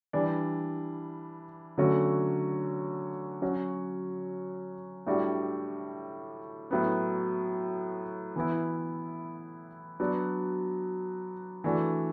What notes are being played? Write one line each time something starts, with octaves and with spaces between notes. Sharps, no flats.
E3 G3 D4
D3 F#3 A3 C#4 F#4
F#3 C#4 F#4
A2 G3 D4 F#4
A2 F#3 B3
E3 B3 E4
F#3 B3 D4
E3 A3 D4 F#4